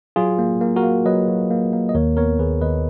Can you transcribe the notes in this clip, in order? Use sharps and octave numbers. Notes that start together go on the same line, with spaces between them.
F#3 F4 G#4
A#3
A#3
F#4 A#4
A#3
F#3 B4 D#5
F#3
A#3
A#3
D#5
D#2 A#4 C#5
B3 A#4 C#5
D#2 G#4 B4
D#2 B4 D#5